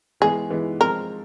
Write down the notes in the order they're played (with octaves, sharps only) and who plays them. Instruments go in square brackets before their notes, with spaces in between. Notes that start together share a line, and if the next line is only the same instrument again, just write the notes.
[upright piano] E3 G#3 B3 [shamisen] G#4
[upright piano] E3 G#3 B3
[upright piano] F3 G#3 C4 [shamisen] A#4